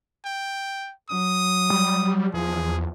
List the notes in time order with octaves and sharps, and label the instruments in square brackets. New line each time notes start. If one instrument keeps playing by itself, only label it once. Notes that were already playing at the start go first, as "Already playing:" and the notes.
[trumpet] G5
[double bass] F#3 [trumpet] D#6
[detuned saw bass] G3
[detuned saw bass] E2 [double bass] F3 [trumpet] G#4